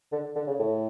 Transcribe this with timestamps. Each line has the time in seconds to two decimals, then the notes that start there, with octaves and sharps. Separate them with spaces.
0.12 D3
0.36 D3
0.47 C#3
0.60 A2